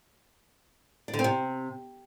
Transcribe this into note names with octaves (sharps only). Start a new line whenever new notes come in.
D4
D3
C4
C3